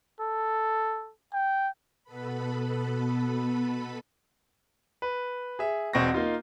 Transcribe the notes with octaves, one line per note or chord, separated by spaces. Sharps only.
A4
G5
B2 B3 A4 B4 B5
B4
G#4 E5
E1 B2 C4 C#6 A#6
A#3 D#4 F4